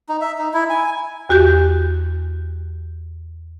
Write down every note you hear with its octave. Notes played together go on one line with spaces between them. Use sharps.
D#4
E5
D#4
E4
G#5
E2 F#4 G4 G6